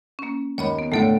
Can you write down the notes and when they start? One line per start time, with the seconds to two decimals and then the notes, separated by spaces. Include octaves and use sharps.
0.19 A#3 C#4
0.58 D#2 C#5 D#5 B5
0.79 B3
0.92 A2 D3 A3 A4 C#5 D7